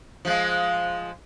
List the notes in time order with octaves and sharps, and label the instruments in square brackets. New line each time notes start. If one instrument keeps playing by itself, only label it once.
[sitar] F3 G#3